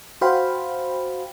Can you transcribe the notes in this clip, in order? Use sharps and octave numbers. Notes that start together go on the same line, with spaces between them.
F#4 C5 F5 G5 B5